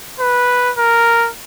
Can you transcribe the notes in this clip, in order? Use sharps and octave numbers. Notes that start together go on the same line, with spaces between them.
B4
A#4